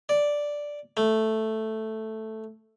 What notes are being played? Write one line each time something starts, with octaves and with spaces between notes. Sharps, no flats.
D5
A3